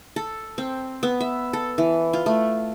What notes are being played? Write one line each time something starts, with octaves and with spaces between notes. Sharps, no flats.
A4
C4
B3
E5
A4
E3
F4
A3